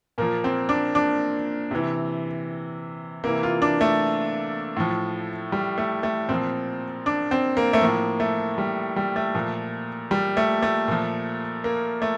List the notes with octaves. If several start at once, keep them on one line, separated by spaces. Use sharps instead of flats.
A#2 F3 A#3
C4
D4
D4
C3 E3
C3 E3 A#3
F4
D4
A3
A2 F3
G3
A3
A3
A#2 C4
F3
D4
C4
A#3
A3
A2 F3 A#3
A3
G3
G3
A3
A#2 F3
G3
A3
A3
A#2 F3
A#3
A3